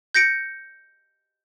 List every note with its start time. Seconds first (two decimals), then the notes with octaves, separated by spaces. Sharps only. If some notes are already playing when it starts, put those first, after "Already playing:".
0.14 G6 A#6 C#7 D7